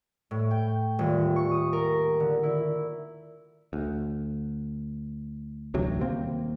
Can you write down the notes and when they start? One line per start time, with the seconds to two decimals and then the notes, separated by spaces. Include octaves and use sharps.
0.31 A2
0.51 G5
0.99 D#1
1.36 C#6
1.51 D#6
1.73 A#4
2.20 D3
2.43 E4
3.73 D2
5.74 A1 D2 C3 F#3
6.01 D#1 A#3 C4